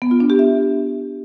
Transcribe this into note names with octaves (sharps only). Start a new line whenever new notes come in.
B3
F4
D4
G4
E5